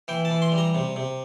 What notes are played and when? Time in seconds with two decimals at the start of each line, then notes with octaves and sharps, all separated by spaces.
0.08 E3 G5
0.25 A5
0.31 E3
0.42 C6
0.52 G3
0.58 A#5
0.75 C3
0.96 C3